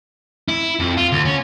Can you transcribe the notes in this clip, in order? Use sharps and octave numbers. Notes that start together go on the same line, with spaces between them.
E4
F2
F4
D2
C#4